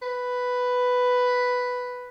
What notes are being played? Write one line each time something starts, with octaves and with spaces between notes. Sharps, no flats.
B4